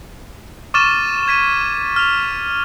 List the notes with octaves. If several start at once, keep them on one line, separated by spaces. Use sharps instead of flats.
C#6 D6 F6 A6 D#7 E7
G#6 B6 D#7
F6 F7